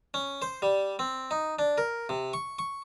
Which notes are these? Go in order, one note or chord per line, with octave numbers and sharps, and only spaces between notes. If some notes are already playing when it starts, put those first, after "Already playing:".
C#4
C5
G3
C4
D#4
D4
A#4
C3
C#6
C#6